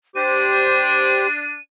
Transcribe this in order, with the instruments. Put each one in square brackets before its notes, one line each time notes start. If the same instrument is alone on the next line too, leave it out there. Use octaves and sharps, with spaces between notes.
[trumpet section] D4 [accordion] G4 C5 [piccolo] D#7